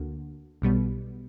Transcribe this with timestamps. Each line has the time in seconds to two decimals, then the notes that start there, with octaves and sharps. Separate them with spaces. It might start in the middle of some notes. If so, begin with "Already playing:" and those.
Already playing: D2 D3 A#3 F#4
0.62 B1 B2 G3 B3